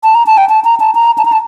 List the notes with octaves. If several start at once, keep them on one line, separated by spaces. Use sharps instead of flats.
A5
A#5
A5
G5
A5
A#5
A5
A#5
A5
A#5
A5